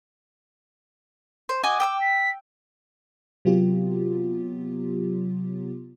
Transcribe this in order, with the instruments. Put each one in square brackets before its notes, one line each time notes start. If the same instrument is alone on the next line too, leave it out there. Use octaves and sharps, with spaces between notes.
[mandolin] C5
[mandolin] F#4 D#5 G#5 [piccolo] D6
[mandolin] G5 D#6 E6
[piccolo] B6
[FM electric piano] C3 F#3 B3 F4 G4